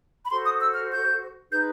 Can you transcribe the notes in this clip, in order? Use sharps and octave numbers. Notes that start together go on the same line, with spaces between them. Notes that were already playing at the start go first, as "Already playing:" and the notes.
B5
F#4 A4 C5 C6
D#6
E6
F6
G6
D#4 G#4 B4 G6